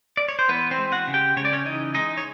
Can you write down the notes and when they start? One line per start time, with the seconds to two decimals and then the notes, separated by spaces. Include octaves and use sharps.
0.17 D5
0.28 C#5
0.39 C5
0.48 E3 B3 B4
0.71 C4 C5
0.78 G#3
0.92 F#4 F#5
1.08 C#3
1.14 G4 G5
1.37 C#3 C#5
1.45 D5
1.53 C#4 C#5
1.65 E3 D#4 D#5
1.95 G#3 D#4 D#5
2.17 C#5